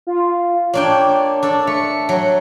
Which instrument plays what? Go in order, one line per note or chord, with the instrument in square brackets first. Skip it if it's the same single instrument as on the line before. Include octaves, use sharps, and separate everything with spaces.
[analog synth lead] F4
[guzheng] A#3 D4 G5 [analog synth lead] C#5
[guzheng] D4 A4
[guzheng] A3 [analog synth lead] C#7
[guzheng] F#3